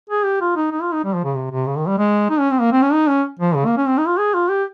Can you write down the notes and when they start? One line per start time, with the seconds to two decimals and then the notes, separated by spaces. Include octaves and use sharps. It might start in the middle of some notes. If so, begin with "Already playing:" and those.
0.10 G#4
0.24 G4
0.41 F4
0.56 D#4
0.72 D#4
0.82 F4
0.93 D#4
1.04 G3
1.15 F3
1.24 C#3
1.35 C3
1.51 C3
1.66 C#3
1.78 D#3
1.88 G3
1.98 G#3
2.30 D#4
2.40 C#4
2.51 C4
2.61 A#3
2.72 C4
2.82 C#4
2.93 D#4
3.08 C#4
3.39 F3
3.55 C#3
3.66 A#3
3.77 C#4
3.87 C4
3.98 D#4
4.07 F4
4.19 G#4
4.34 F4
4.50 G4